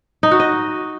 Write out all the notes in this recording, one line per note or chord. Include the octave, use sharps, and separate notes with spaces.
D#4
F#4
D#5